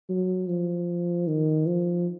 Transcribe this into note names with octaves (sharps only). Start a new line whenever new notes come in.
F#3
F3
D#3
F3